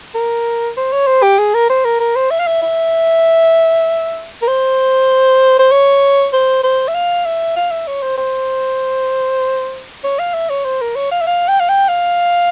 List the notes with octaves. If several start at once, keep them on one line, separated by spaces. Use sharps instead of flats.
A#4
C5
C#5
C5
G4
G#4
A#4
C5
A#4
A#4
C5
E5
F5
E5
E5
A#4
C5
C5
C#5
C5
C5
E5
F5
E5
F5
E5
C#5
C5
C5
C#5
F5
E5
C#5
C5
A#4
C#5
F5
E5
F5
G5
F5
G5
F5